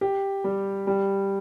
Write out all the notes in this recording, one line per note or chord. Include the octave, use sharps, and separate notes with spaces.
G4
G3
G3